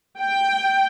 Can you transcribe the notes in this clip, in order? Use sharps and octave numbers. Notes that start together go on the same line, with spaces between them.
G5